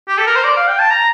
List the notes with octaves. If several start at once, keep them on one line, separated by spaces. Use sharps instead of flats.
G4
A4
A#4
C5
D5
F5
G5
A5
A#5